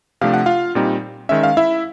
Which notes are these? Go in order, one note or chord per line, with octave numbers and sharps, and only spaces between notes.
C3 F3 A3 D4 F5
F#5
F4 F5
A#2 G3 C4 D#4
D#3 G#3 C#4 E5
F5
E4 E5